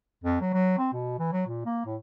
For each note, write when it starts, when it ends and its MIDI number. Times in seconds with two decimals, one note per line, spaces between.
0.24 0.37 41
0.41 0.49 54
0.54 0.74 54
0.78 0.88 60
0.93 1.16 47
1.19 1.31 52
1.32 1.43 54
1.47 1.65 46
1.66 1.82 58
1.86 1.96 45